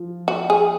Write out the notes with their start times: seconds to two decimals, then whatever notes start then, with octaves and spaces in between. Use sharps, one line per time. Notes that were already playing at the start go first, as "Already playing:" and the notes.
Already playing: F3
0.28 F#4
0.50 G#4